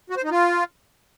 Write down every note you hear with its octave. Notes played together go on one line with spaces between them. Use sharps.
F#4
C5
D#4
F4